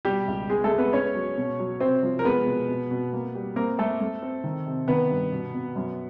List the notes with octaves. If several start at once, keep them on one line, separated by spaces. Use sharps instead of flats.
B2 G3 G4
C#2
G#3 B3 G#4
A3 A4
G#3
B3 B4
B3 C#4 C#5
F#3
B2
F#3
C3 C4 C5
F3
A#4
G#3 B3 B4
B2
B2
B2
A#3
G3
A#3 C4 A#4
A3 C4 A4
A3
C4
D#3
C3
D#3 B3 B4
G2
B2
B2
F#2